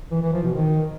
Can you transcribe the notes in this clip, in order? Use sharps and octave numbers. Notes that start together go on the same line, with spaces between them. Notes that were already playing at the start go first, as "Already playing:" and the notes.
E3
E3
F3
B2
D#3